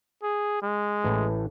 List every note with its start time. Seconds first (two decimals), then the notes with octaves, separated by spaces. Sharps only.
0.23 G#4
0.62 G#3
1.04 A1 A2 E3